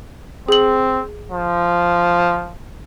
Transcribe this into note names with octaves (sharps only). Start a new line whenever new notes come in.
C4 G#4 F#7
F3